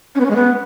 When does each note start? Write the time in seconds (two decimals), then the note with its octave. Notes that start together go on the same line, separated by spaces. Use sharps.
0.15 C#4
0.20 B3
0.25 C#4
0.31 G#3
0.36 B3